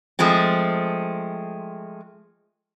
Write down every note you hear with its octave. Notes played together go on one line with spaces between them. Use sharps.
F3 G#3 A3 C4